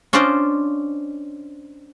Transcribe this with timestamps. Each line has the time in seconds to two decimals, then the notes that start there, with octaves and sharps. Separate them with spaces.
0.13 C#4 D4 F4 C5 D5 D#5